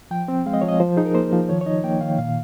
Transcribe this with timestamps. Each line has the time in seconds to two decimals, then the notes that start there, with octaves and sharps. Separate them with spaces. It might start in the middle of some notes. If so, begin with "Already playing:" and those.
0.11 F3 G5
0.28 C4
0.46 G#3 F5
0.53 D#5
0.61 F3 C#5
0.69 D#5
0.80 F3 C5
0.97 D#4 G#4
1.06 A#4
1.14 A#3 C5
1.33 F3
1.49 D#3 C#5
1.61 C#5
1.66 D#4 D#5
1.84 A#3 G5
2.01 D#3 F5
2.18 A#2 F5